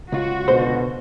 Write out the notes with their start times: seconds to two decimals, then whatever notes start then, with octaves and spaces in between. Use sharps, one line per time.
0.12 C#2 F4 F#4
0.48 B2 D3 C5